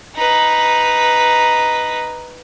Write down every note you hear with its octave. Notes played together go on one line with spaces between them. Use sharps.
D#4 B4